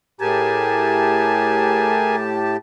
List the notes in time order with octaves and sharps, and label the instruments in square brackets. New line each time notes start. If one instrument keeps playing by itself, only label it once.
[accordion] A2 G4 A5 [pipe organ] G#4 A#4 G#5